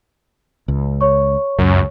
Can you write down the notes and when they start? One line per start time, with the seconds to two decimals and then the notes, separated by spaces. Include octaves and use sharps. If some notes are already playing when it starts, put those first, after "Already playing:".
0.68 C#2
1.01 C#5 C#6
1.59 C#2 F#2